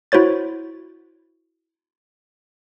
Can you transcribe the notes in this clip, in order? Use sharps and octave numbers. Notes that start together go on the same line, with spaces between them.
E4 F#4 C5 C#5 A6